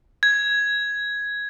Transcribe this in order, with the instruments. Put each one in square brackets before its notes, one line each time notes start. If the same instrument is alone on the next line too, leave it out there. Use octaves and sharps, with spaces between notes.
[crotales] G#6